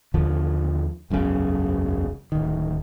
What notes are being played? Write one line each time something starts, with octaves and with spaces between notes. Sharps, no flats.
D#2 D3 F3
E1 B1 F#2 C#3
D1 D#3